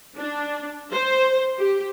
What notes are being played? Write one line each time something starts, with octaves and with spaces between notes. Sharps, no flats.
D4
C5
G4